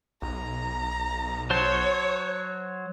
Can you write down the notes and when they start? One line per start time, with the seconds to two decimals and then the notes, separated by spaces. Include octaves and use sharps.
0.22 B1 A#5
1.50 F#3 C5 C#5 A5